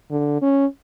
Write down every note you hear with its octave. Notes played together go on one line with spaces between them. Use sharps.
D3
C#4